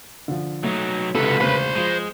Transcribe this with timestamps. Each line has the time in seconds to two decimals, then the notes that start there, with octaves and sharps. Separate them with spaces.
0.28 D3 F3
0.63 F#3 A3 D#4
1.15 C#2 C3 A4 B4
1.41 E1 D2 C#3 C5 B5
1.75 F3 G#3 D#7